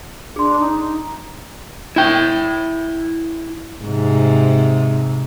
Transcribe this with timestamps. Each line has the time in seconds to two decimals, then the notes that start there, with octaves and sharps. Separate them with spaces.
0.36 D4 G#4 C6
0.60 D#4
1.96 E4 G5
3.84 G#2 C3